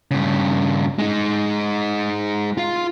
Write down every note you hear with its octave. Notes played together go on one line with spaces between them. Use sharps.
G2 C#3
G#3 D#4
F4 F5